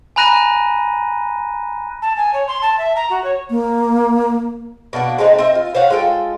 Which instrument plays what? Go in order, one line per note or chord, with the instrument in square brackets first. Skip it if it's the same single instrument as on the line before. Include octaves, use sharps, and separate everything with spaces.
[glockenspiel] G#5 A#5 B5 F#6 A#6 D#7
[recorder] A5
G#5
C#5
C6
A5
E5
A#5
F#4
C#5
[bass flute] A#3
[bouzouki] B2 A#3 D4 F#5
G#3 A3 C4 D#4
C4 D#5 E5
F4
C5 C#5 F5 F#5
G#3 F4 A4 G5